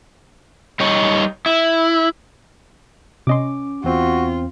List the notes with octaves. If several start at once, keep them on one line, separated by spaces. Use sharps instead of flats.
G3 D#4 C#5
E4
C3 C#4 D#5 C6 D6
E2 C4 F4 F#4